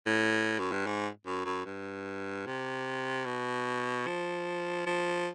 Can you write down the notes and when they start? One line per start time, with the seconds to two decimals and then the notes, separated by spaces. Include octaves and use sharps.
0.06 A2
0.59 F#2
0.72 G2
0.86 G#2
1.26 F#2
1.45 F#2
1.65 G2
2.46 C3
3.25 B2
4.07 F3
4.86 F3